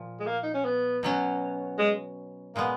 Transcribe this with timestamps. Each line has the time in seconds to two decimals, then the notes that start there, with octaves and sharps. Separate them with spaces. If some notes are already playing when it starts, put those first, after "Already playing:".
Already playing: A#2 F3
0.20 G#3
0.26 A#3
0.43 D#4
0.54 C#4
0.65 B3
1.03 B2 F#3 C#4
1.79 G#3
2.55 A#2 G#3 A#3 B3